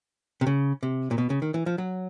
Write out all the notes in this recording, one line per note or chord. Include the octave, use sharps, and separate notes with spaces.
C3
C#3
C3
A#2
B2
C#3
D#3
E3
F3
F#3